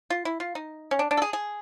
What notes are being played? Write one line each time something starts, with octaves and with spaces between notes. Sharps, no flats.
F4
E4
F4
D#4
C#4
D4
D4
A4
G#4
G#4